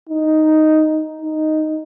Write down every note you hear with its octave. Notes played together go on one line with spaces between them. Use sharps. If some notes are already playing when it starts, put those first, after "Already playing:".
D#4
D#4